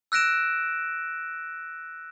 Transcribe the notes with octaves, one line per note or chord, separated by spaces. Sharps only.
E6 F#6 A#6 D7 E7